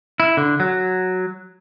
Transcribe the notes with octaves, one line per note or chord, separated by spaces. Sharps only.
E4
D3
F#3